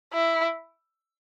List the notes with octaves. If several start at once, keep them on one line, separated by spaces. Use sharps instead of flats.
E4